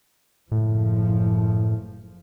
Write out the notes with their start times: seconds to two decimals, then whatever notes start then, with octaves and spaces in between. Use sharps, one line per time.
0.52 F#1 A2 F3